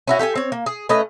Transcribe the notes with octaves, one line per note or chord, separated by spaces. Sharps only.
C#4 E4 F#4
G4 A4 D5 G#5
C4 C#5
A#3
G#4
A3 C#4 B4 D#5